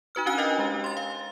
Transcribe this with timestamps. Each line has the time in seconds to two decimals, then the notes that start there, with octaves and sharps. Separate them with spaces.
0.15 D#4 F#4 B4 F6
0.26 C#4 D4 F#4 F5 G#5 F#6
0.38 A#4 D#5 F5 G5
0.58 G#3 G4
0.84 C6 A6
0.97 F5